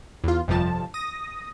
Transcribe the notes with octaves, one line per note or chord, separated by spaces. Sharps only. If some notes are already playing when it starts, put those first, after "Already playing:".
E2 F4
G1 F2 C3 F3 A5
D#6 A#6